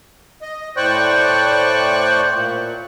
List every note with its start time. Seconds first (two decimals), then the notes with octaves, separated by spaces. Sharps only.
0.42 D#5
0.77 A2 C5 D5 G5 C#6 F#6
2.33 A#2